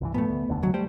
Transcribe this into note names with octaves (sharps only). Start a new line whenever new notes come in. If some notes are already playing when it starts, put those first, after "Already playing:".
C2 G2 E3
G2 A#2 F3 A3 B3
D2
F1 D#2 D3
C#2 F#3
G3 A3 C5 G5